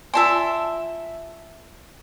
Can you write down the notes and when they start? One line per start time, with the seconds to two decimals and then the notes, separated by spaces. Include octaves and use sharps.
0.14 F4 D5 E5 G#5 A5 C6